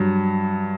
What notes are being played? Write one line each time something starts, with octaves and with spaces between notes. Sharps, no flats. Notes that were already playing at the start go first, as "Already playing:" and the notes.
Already playing: G2 F#3